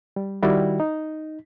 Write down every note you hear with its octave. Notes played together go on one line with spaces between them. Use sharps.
G3
D#3 G3 E4 F#4
D#4